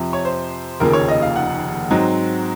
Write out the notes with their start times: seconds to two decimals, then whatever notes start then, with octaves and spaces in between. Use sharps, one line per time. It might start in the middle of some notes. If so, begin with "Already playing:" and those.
Already playing: F2 C3 F3
0.13 C#5
0.25 C5
0.80 F1 D#2 C#3 F3 A#3 A#4
0.93 C#5
1.08 D#5
1.22 F5
1.36 F#5
1.90 G#2 F#3 C4 D#4